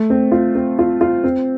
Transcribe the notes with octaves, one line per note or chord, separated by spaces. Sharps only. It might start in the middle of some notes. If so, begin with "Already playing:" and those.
Already playing: A3
C4
F4
C4
F4
F4
C4